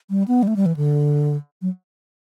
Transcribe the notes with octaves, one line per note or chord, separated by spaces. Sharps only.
G3
B3
G3
A3
G3
E3
D3
F#3